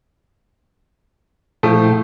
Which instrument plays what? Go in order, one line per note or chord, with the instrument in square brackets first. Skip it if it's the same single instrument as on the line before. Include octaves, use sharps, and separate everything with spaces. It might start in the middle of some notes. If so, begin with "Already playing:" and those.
[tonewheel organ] A#2 E4 G5 [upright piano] F3 A3